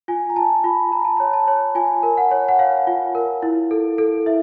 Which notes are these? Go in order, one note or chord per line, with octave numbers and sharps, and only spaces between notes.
F4 G#5
A#5
F4 A5
F4 B5
F4 A#5
A5
C#5 A#5
A5
C#5
F4 G#5
A#4
F#5
C#5
F#5
C#5 F5
F4
A#4
E4
A4
A4
E4 E5